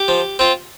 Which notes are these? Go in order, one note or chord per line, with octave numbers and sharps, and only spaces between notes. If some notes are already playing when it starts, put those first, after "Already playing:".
Already playing: G4
F3
C4 F4